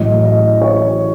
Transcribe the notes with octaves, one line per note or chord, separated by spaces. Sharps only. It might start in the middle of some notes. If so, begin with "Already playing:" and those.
Already playing: A1 A2 F#3 D#5
D#5
C#5